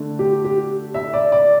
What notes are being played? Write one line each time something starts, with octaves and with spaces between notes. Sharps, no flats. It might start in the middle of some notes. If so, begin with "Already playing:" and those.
Already playing: D3 A3 D4
G4
G4
E5
D5
D5